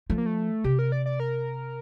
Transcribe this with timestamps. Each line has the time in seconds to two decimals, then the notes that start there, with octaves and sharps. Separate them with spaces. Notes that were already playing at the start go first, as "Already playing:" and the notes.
0.10 F3 A3
0.18 A#3
0.26 A3
0.64 C3 G4
0.79 A#4
0.92 D5
1.06 D5
1.20 A#4